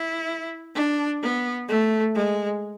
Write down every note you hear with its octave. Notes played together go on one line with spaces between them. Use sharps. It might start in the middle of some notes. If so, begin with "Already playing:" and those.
Already playing: E4
D4
B3
A3
G#3